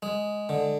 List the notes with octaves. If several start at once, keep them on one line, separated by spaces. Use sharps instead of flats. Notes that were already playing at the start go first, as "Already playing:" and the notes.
G#3
D3